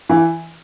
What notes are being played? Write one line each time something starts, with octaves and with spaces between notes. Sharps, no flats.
E3